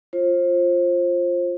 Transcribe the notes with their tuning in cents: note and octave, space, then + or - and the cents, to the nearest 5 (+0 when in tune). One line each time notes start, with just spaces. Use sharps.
F4 +0 C5 +25